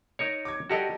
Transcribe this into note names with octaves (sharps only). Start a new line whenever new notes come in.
D#4 A#4 C#5
D6 G#6
G3 F#4 G4 A4 A#4 D#5